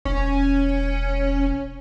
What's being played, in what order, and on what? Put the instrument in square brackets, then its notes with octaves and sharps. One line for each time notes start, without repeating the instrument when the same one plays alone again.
[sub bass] E1 [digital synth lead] C#4